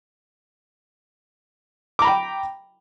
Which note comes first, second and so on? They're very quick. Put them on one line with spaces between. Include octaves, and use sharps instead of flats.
D6 A#5 B5 G5